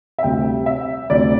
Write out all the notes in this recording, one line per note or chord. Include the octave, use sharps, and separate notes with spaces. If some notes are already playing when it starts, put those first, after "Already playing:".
E5
D2 C3 G3 C4 G5
E5
D2 C3 G3 C4 D5